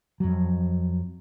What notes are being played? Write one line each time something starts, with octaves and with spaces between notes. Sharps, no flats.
F2 F#3